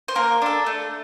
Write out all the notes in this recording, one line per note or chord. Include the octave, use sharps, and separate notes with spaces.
C5
A#3 A#4
D4 A4
A3